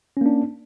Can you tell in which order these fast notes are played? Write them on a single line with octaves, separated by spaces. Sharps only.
C#4 A#3 D4